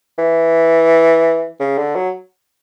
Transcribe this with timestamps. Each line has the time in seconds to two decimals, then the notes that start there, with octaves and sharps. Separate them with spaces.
0.18 E3
1.60 C#3
1.78 D3
1.96 F#3